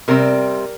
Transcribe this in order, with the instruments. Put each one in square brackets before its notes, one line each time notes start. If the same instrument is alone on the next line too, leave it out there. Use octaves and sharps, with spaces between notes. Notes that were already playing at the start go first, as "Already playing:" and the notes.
[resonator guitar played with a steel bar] C3 G3 C4 A#4